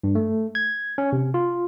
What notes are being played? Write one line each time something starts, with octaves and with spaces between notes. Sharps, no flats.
G2
A3
G#6
C#4
C3
F4